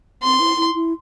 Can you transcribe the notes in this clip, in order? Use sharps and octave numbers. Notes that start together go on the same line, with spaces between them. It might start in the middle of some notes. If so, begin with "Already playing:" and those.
C4 C6
E4
E4
E4